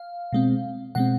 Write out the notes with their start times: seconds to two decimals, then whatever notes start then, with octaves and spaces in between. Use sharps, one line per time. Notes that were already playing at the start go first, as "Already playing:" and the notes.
Already playing: F5
0.33 B2 G#3 C4
0.95 B2 G#3 C4 F#5